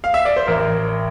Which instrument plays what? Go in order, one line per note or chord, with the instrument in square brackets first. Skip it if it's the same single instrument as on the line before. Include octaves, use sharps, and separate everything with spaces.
[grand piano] F5
E5
D5
C5
A1 A#4